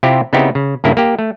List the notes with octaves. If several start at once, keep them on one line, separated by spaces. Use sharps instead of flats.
C3 C4 E4 F4 G4
C#3 B3 C4 D#4 E4 G4
C#3
G2 C#3 A#3 E4
A#3 G4
A3